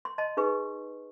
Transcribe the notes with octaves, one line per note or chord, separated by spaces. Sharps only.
C6
D#5 A5 C6
D#4 G#4 B4 C#6